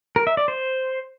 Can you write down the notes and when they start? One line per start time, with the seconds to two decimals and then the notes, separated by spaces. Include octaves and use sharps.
0.16 A#4
0.27 E5
0.37 D5
0.48 C5